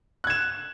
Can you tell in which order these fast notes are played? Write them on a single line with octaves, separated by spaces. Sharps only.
F#6 G#6 E7